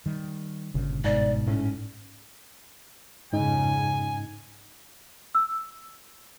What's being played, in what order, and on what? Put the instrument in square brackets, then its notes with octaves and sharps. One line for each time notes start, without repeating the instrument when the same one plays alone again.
[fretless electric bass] D#3 G3
[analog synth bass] G1 [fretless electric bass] A#2 C#3
[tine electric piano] G#2 [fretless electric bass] B2 [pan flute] D5
[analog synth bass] A2 [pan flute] C#4
[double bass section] F2 C#3 [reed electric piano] G#2 D#4 [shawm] G#5
[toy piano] E6